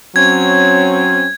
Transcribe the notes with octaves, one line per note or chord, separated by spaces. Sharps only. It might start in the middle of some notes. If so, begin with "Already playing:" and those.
F#3 C4 C#4 G#6